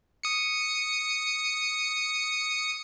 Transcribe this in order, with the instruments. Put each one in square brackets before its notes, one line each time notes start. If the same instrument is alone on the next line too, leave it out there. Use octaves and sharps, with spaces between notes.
[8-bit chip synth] D#6 C#7